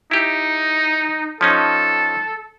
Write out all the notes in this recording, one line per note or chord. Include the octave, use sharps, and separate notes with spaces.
D#4 E4 G4
F3 C#4 D#4 A4